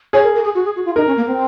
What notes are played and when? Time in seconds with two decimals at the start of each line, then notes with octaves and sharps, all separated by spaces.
0.13 G#4 C#5
0.24 A#4
0.35 A#4
0.44 G#4
0.55 F#4
0.65 G#4
0.76 F#4
0.85 F4
0.96 D#4 A#4
1.07 C#4
1.17 A#3
1.27 C4